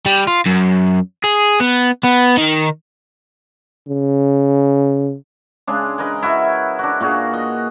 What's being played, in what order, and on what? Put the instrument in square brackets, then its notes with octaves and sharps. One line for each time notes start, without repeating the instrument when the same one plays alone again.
[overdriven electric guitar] G3
F4
F#2
G#4
B3
B3
D#3
[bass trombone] C#3
[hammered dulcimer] C#3 G#3 D4
G#4 A#4 B4 D#5
E4 F#4 C#5 E5
D4 F#4
A#2 F4 F#4 G#4
D#5